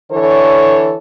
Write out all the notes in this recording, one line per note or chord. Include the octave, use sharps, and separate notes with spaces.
D3 E3 A4 C#5